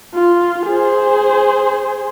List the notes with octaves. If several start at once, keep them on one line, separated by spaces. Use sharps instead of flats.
F4
G#4 C5